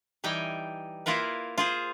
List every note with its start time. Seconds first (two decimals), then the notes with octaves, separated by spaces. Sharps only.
0.24 E3 G3 D#4 G5 G#5
1.06 A#3 E4 F4 A#4 B4
1.58 F4 G#4 C5